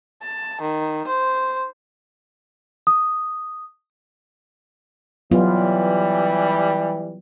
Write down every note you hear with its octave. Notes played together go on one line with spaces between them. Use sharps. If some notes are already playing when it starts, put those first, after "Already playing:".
A5
D#3
C5
D#6
E3 F#3 G3 B3 F4